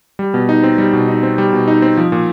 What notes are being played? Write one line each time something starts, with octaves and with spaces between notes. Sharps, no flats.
G3
B2
D#4
C4
G3
B2
D#4
C4
G3
B2
D#4
C4
F3
A#2